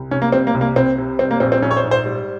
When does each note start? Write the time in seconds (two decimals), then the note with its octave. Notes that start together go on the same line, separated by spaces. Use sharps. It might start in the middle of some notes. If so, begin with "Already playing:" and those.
Already playing: C2
0.11 C3 C#4
0.22 A#3
0.32 G3 C4
0.47 A#3
0.54 C2
0.61 A#3
0.76 C2 C4
0.98 C3
1.19 G3 C4
1.31 A#3
1.40 A#1 C4
1.52 C4
1.62 A#1 C#4
1.71 C#5
1.77 C5
1.84 G#2
1.91 C5
2.06 G3